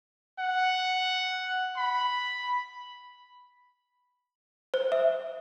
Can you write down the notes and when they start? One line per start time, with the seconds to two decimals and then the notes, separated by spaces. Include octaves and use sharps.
0.39 F#5
1.77 B5
4.74 C5
4.92 E5